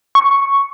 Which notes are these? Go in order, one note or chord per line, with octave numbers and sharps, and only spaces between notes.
C#6